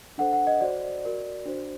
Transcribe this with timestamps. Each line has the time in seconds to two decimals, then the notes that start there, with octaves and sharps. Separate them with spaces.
0.18 D4 A4 C5 F#5
0.33 F#5
0.47 D#5
0.61 F#4 C5 D5
1.04 F#4 A#4 D5
1.45 D4 F#4 C5